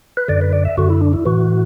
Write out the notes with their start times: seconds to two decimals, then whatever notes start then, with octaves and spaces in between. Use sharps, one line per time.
0.17 B4
0.28 F#2 D3 D5
0.41 B4
0.53 D5
0.65 E5
0.77 F#2 D3 F#4
0.90 E4
1.01 D4
1.13 E4
1.25 A2 E3 F#4